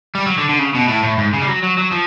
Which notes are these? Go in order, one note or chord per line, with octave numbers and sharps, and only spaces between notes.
G3
F#3
D3
D3
C#3
B2
A2
A2
G#2
C#3
G3
F#3
F#3
F#3
F3